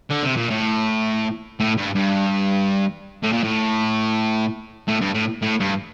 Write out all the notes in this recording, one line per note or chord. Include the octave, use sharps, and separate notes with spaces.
D3
C3
A#2
A2
A2
G2
G2
A2
A#2
A2
A2
G2
A2
A2
G2